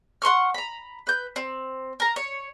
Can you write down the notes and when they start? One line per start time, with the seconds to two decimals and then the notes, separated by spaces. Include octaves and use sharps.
0.22 F#5 C6 C#6 F6
0.54 A#5 B5
1.07 B4 G6
1.36 C4
2.00 A#4 A#5
2.16 C#5